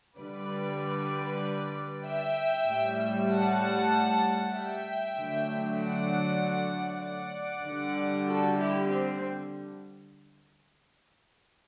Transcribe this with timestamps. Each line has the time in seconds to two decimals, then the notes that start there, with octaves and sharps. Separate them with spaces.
0.18 D3 G3 B4 D5
2.05 E5 G5
2.67 A2 G3
3.29 F#5 A5
4.54 E5 G5
5.16 D3 F#3 A3
5.79 D5 F#5
7.03 D5 F#5
7.65 D3 G3
8.28 F#4 A4
8.58 E4 G4
8.90 C4